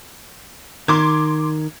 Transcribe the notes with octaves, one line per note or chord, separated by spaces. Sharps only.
D#3 C6 D6 G#6